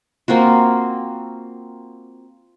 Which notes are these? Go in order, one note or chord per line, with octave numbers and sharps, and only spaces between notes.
A#3 C4 F4 F#4